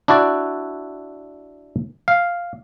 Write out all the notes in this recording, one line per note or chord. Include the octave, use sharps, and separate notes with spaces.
D4 E4 F#4 D5
F5